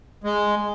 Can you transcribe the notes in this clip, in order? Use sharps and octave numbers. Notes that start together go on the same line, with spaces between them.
G#3